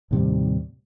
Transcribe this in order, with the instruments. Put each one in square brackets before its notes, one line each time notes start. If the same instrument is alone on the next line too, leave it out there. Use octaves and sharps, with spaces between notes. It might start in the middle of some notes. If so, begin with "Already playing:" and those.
[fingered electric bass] D#2 A2 C3 G3